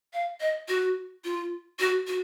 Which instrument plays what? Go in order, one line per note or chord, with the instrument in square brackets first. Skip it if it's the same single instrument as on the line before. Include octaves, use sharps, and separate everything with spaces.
[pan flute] F5
D#5
F#4
F4
F#4
F#4